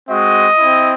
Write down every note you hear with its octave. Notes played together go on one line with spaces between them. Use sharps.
G#3 C4 F#4 D#5
C4 E4